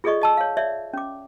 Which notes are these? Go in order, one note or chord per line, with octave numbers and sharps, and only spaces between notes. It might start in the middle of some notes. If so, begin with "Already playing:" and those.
F4 G#4 A4 D5 D#5 C#6
D#5 A5 E6
C#5 F5
C#5 D5 E5
C#4 D6